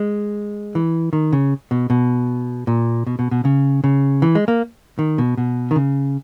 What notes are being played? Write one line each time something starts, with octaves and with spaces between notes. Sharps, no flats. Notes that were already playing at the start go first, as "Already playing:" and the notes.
Already playing: G#3
E3
D#3
C#3
B2
B2
A#2
B2
B2
B2
C#3
C#3
E3
G#3
A#3
D#3
B2
B2
D#3
C#3